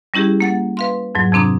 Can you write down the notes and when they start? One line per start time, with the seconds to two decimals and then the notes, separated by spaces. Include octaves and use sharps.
0.14 G3 C#4 E4 G4 G#4
0.40 A#3 F#5 A6
0.77 B4 F5 C6
1.15 F2 G#2 F#3
1.32 F2 C3 C4 D4 A#5 D#6